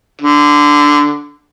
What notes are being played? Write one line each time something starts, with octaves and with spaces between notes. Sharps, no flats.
D3